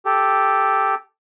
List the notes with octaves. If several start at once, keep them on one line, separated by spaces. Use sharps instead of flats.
G4 A4